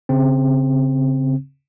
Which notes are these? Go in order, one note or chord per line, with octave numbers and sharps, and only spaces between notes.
C#3 C4